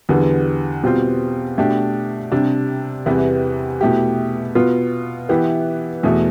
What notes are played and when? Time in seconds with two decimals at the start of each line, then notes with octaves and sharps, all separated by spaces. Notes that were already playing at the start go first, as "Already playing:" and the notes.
0.09 E2 D3 G3 B3
0.84 B2 G3 C4 F4
1.58 B2 A3 D4 G4
2.32 C3 G3 D4
3.06 E2 C3 E3 G3 B3
3.81 B2 A3 E4 G4
4.55 B2 B3 F4
5.29 E3 B3 E4 G4
6.03 E2 B2 A3